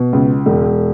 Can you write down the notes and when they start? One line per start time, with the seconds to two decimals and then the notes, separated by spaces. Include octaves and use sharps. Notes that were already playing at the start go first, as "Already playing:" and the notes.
Already playing: B2
0.13 C#2
0.46 E1